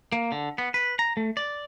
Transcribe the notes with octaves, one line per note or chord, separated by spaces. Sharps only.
A#3
D3
B3
B4
A#5
A3
D5